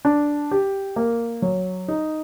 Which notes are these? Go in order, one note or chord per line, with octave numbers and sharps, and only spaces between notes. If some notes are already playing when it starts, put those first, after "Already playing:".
D4
G4
A#3
F#3
D#4